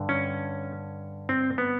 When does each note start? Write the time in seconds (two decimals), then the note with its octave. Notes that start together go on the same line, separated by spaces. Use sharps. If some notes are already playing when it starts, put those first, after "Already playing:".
Already playing: G2 D3
0.09 C#4
1.29 C4
1.58 B3